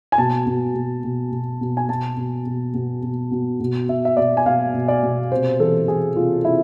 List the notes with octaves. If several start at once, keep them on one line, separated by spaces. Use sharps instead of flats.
G#5
B2 A5
B2
B2
B2
B2
B2
G#5
B2 A5
B2
B2
B2
B2
B2
B2
B2 E5
E5
B2 D5
G#5
B2 F5
B2
D5
B2
C3 C5
E3 A4
E3 G#4
C3 F4
C3 E4